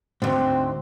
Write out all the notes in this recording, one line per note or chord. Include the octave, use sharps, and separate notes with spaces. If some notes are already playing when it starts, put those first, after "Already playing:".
D2 G#2 C4